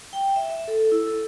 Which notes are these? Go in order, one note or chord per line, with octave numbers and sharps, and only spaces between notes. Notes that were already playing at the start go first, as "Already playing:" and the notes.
G5
E5
E5
A4
E4
A4